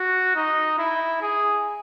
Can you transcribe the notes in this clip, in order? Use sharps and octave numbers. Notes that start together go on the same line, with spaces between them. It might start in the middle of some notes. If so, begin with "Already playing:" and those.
Already playing: F#4
D#4
E4
G#4